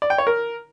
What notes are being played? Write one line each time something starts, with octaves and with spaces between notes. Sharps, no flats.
D5
G5
C#5
A#4